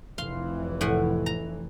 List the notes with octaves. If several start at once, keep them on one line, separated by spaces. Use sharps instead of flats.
F1 E3 F5 C6
A2 F#5 G#5
A#5